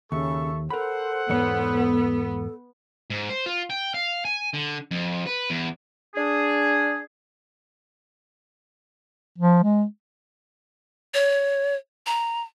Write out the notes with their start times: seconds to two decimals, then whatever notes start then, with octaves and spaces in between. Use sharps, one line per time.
0.12 D#2 C#3 A4 E5 C#6
0.70 A4 A#4 C5 F#5 B5
1.30 E2 G#2 B3 C#5
3.10 G#2
3.30 C5
3.46 F4
3.70 G5
3.94 F5
4.25 G#5
4.54 D3
4.91 F2
5.27 B4
5.50 E2
6.15 D4 G#4
9.38 F3
9.63 G#3
11.14 C#5
12.06 A#5